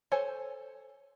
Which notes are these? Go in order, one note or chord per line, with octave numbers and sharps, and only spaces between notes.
A4 C5 C#5 G#5